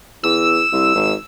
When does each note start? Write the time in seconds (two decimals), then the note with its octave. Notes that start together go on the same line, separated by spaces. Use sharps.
0.24 E2 E6
0.72 C2
0.95 G#1